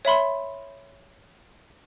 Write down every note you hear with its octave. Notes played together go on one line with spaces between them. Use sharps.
C#5 E5 B5 C6